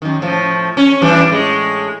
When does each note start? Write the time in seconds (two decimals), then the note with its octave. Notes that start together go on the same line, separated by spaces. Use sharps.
0.02 F#2 D#3
0.22 A2 F3
0.77 C#4
1.02 E3 G3 D4
1.29 A2 G#3